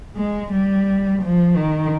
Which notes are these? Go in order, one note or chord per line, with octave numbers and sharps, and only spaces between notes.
G#3
G3
F3
D#3